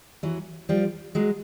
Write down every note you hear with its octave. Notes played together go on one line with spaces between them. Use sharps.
E3 F#3
F3 G3
F#3 G#3